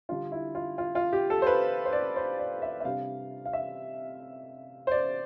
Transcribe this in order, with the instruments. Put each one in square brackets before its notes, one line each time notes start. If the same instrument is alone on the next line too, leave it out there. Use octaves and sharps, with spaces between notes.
[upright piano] D3 G3 D4 F4
E4
F4
F4
F4
G4
A4
C5
B4
C5
D5
C5
D5
E5
E5
C3 G3 D4 F5
F5
E5
C5
D5